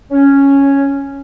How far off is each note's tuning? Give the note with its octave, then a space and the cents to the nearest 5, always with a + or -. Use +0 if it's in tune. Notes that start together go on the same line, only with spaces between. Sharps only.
C#4 +0